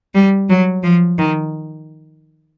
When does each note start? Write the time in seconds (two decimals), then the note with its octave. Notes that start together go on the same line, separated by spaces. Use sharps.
0.15 G3
0.49 F#3
0.83 F3
1.18 D#3